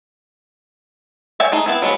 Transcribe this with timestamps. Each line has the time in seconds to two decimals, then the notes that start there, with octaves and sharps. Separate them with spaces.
1.40 C#5 D5 E5 G5 G#5
1.52 A3 D#4 G#4
1.66 B3 C4 E4
1.82 F#3 G#3 B3 B5